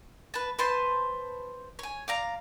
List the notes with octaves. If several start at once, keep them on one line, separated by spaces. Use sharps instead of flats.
B4 A5
B4 C5 A5 C6
C#5 G#5
D5 F5 A#5